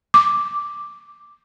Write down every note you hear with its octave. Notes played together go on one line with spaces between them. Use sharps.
D6